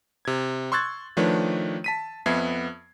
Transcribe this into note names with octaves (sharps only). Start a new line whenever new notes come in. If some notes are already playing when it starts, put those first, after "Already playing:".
C3 G#6
C6 C#6 E6 F#6 G#6 A6
D#3 F3 A3 D4 B4 C#5
A5 B6 D#7
F2 B3 E5 G#6 C7